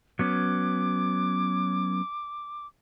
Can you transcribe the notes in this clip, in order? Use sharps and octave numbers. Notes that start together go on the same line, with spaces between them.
F#3 B3 C#4 D6